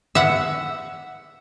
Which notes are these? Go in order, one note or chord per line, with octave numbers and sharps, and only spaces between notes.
E5 F#5